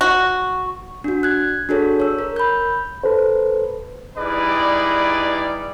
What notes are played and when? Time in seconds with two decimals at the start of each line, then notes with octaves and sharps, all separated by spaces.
0.01 F#4
1.04 D4 F#4
1.23 F#6 G#6
1.69 D4 F#4 G#4 A4 C#5
2.00 C#5 E6
2.19 A#4
2.36 B5 G6
3.04 A4 B4 C5
4.17 G3 D#4 E4 G#4 B4 D5